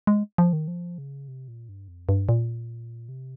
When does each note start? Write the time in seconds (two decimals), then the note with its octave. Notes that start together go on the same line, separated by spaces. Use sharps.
0.07 G#3
0.38 F3
0.53 D#3
0.68 F3
0.98 C#3
1.28 C3
1.48 A#2
1.69 G2
1.88 F2
2.09 G2
2.29 A#2
3.09 C3